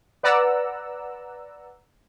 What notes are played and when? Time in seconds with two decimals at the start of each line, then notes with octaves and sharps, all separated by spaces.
0.23 B4 D5 F#5 A#5 E6